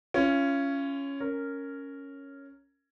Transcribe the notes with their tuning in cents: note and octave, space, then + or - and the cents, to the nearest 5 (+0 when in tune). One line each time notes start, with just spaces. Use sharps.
C#4 +0 F4 -35
C#4 +0 A#4 -10